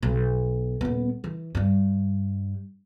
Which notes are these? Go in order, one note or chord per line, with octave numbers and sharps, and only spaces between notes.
B1
D#1 B3
E3
G2 G3